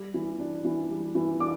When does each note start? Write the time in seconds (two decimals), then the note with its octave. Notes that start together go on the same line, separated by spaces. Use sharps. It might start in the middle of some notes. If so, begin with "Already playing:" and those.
Already playing: G3
0.14 E3
0.39 D4
0.65 E3
0.90 G3
1.15 E3
1.40 D4 D6